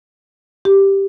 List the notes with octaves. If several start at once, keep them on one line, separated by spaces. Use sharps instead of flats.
G4